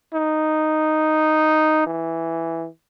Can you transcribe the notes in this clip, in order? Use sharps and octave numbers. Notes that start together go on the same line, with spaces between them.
D#4
E3